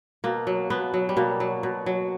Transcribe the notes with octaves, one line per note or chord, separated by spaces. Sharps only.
B2 A#3
F#3
B2 B3
F#3
G3
B2 A#3
F#3
B2
F#3